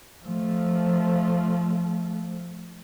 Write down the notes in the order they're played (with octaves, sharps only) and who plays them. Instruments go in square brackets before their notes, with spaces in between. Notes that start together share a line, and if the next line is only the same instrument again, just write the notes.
[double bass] F3 A3